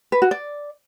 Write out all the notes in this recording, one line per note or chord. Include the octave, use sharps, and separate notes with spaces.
B4
F#4
D5